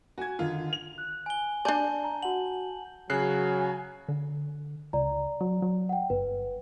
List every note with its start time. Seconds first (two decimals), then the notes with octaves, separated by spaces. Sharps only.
0.18 F#4 G#5 G#6
0.39 D3 D#3 F4 A#4
0.73 F7
0.98 F#6
1.26 G#5 G7
1.65 D4 D5 G#5 A5 G6 G7
2.04 A#5
2.23 F#4 F#5 F#7
3.10 C#3 F#3 G#5 F#6 C7
4.09 D3
4.93 C#2 D5 A#5
5.41 F#3
5.62 F#3
5.89 F#5 G5
6.10 G1 B4